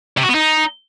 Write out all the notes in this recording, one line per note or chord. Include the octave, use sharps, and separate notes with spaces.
C3
F#4
B3
D#4